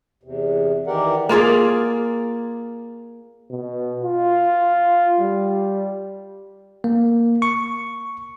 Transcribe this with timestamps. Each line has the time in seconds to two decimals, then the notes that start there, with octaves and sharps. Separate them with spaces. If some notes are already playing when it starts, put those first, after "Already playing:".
0.23 E2 C3
0.87 D#3 E3 G4 A#4 D5 F#5
1.29 A#3 F4 G#4 D5
3.51 B2
4.04 F4
5.20 G3
6.84 A#3
7.42 C#6